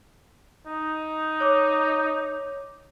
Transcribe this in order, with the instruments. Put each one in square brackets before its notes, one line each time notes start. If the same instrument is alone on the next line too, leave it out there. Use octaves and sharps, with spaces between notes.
[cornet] D#4
[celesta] C#5 D6